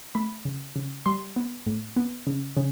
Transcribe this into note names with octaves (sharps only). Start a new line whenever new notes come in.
A3 B5
C#3
C#3
G3 C6
B3
A2
B3
C#3
C#3